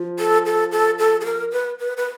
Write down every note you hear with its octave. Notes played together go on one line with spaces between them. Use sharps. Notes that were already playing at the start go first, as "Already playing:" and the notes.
Already playing: F3
A4
A4
A4
A4
A4
A#4
B4
B4
B4